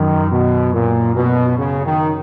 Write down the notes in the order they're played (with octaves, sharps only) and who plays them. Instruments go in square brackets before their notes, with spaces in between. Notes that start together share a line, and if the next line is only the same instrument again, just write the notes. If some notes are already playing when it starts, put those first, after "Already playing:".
Already playing: [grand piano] F#2 [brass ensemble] D#3
[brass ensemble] B2
A#2
B2
C#3
D#3